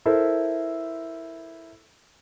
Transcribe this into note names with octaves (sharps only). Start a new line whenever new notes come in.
E4 A4 A#4 C5 E5